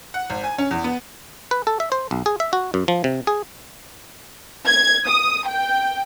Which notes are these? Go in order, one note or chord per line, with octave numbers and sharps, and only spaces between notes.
F#5
G#1
G#5
C#4
E2
B3
B4
A4
E5
C5
B1
G#4
E5
F#4
F#2
F3
C3
G#4
G#6
D#6
G5